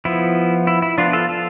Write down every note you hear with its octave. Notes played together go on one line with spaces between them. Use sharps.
F3 B3 E4
E4
E4
F3 B3 D4 F4
F4 A4
F4 A4